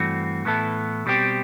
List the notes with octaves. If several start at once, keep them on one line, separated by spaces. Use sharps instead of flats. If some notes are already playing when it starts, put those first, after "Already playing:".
Already playing: G2 E3 A3 C4 F#4
A2 E3 B3 E4 A4
B2 G3 C4 G4